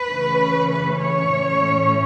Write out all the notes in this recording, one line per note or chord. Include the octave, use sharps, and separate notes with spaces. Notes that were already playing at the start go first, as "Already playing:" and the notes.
Already playing: B4
C#3 E3 A3 C#4
B4
C#5
A2 E3 A3 C#4